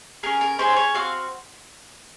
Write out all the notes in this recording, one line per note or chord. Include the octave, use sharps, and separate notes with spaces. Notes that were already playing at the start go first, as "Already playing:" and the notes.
C#4 G#4 A#4
A#4
C#4 G#4 C5
C#5
C4 F#4 F5